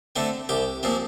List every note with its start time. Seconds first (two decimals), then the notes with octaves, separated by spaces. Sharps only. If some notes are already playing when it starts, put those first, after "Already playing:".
0.16 D3 A3 C4
0.49 C2 G4
0.83 A#2 F3 C4